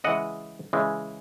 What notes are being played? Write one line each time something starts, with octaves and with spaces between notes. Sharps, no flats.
C#3 E3 G#3 D#5 F#5
C#3 E3 G#3